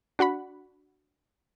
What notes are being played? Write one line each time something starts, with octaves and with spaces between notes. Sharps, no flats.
D4 F#4 F#5 B5